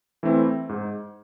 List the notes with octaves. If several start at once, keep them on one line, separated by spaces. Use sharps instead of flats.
E3 A3 C4 E4
G#2